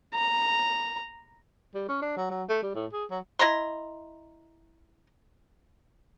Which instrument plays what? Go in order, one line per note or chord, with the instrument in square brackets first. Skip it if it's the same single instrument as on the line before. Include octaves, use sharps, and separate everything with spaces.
[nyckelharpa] A#5
[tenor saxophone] G3
C#4
D4
F#3
F#3
A3
G3
A2
G#4
F#3
[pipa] E4 D#5 A#5 C6